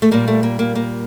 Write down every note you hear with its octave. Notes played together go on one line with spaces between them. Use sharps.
A3
A#2 G3 A#3
A3
A#3
A#3
A#3